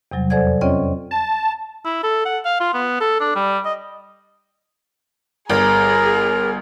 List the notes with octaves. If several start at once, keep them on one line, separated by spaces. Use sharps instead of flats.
E2 C3 F#3 G3
F2 A4 C5 D5 F#5 G#6
C4 C#4 F4 C#5 D#5 G5
A5
E4
A4
F#5
F5
F4
B3
A4
D4
G3
D#5
G1 G#4 A#4 A#5